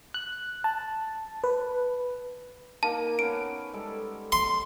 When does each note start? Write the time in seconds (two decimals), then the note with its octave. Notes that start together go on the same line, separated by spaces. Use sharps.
0.14 F#6
0.64 A5
1.44 B4
2.83 A#3 D#4 A#4 A5
3.19 B3 C#4 D7
3.73 G3 G#3 A4
4.32 C6